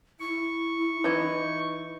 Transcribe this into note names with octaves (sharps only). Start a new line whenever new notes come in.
E4 C#6
E3 D#4